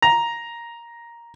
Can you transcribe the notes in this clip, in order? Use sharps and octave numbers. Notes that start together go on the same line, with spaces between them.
A#5